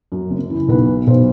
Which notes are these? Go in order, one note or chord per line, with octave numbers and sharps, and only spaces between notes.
F#2
F#1
E3
B1 B4
B2
B1 C5